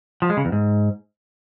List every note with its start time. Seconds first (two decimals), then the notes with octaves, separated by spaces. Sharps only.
0.22 F3
0.30 G#3
0.37 C#3
0.45 E2
0.52 G#2